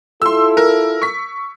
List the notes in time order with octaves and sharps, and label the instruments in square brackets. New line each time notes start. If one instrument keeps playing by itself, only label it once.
[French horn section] E4 F4 A4 [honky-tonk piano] C6 E6
[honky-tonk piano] A#4
C#6 B6